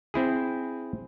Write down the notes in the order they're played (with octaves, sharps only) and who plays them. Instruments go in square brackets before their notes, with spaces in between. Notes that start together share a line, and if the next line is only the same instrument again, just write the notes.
[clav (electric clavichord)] C4 E4 G#4